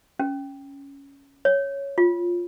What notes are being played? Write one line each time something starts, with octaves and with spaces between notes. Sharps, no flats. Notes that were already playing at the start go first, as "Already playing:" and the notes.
C#4
C#5
F4